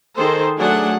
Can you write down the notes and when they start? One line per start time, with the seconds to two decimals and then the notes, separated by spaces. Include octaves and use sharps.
0.15 D#3 G#4 A4 C5
0.57 F#3 A3 D4 G#4 F#5